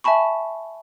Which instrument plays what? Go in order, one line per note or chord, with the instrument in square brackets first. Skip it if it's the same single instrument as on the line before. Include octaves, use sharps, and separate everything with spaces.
[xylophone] E5 G#5 A5 B5 C#6